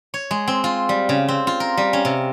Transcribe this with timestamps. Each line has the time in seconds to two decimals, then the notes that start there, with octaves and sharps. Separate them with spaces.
0.14 C#5
0.31 G#3
0.47 C4
0.64 F4
0.89 G3
1.09 C#3
1.28 C4
1.47 F4
1.60 A#4
1.77 G3
1.93 C#4
2.05 C3